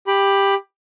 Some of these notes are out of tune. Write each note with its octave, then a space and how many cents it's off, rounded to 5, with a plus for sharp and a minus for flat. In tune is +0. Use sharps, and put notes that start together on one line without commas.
G4 +10 B5 +0